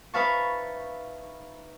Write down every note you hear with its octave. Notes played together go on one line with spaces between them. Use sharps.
D#4 B4 E5 F5 A5 C#6